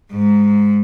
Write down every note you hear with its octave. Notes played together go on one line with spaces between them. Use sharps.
G#2